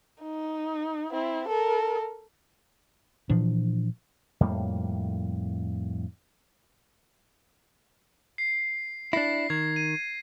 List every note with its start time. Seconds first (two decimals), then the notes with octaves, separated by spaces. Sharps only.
0.22 D#4
1.11 C4 E4
1.48 A4 A#4
3.29 A#2 E3 F3 D4
4.40 F2 A2 G3 A#3
8.38 C7
9.13 D4 E4 A#6 C7
9.50 D#3 G#6
9.76 D#7